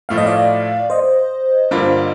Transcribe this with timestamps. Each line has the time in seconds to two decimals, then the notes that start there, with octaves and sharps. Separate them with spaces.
0.09 A2 F3 A3 F5
0.18 D#5
0.26 D5 F5
0.90 C5 D#5
1.71 G2 D3 G3 A#3 F4